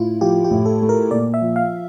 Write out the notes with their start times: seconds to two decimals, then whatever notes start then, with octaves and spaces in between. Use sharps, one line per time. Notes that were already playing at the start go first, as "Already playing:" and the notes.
Already playing: A2 E4 F4
0.21 F3 G4
0.44 G4
0.51 A2
0.66 A4
0.82 A3
0.89 A#4
1.11 A#2 D5
1.34 E5
1.41 F3
1.56 F5